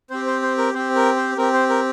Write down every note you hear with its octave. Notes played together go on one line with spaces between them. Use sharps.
C4 G4 C5
C5
C5
A#4
C4 G4 C5
A#4
C5
C4 G4 A#4
C5
A#4